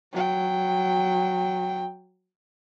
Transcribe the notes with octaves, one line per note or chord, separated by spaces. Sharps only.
F#3 G5